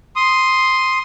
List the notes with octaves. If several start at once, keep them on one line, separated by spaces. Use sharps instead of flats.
C6 D#6